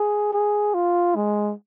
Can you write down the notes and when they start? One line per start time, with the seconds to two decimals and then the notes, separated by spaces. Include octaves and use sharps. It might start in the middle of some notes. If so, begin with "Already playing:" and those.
Already playing: G#4
0.32 G#4
0.74 F4
1.15 G#3